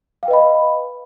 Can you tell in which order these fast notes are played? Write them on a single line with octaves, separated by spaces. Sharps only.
F5 G5 B4 D#5 B5